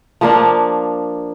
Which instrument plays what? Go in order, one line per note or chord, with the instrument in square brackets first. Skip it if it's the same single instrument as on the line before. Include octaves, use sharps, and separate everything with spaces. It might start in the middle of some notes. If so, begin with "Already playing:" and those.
[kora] F3 A#3 D4